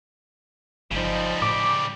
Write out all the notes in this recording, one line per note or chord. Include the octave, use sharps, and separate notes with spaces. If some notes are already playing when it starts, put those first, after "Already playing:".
G1 C#3 F3 G3 D#4
A2 D6